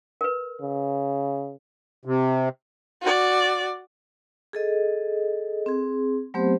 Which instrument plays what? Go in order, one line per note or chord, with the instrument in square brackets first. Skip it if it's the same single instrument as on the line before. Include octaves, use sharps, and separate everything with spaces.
[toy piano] A#4 B4
[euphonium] C#3
[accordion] C3
[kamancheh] F#4 D5
[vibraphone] G#4 A4 D#5
C4 G#4
F#3 A3 B3 C4 G4 C5